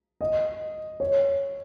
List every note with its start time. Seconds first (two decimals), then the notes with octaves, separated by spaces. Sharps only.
0.21 D#5
1.00 C#5